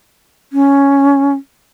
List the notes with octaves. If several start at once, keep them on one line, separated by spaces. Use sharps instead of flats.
C#4